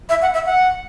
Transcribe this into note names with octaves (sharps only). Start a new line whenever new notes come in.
E5
F#5
E5
F#5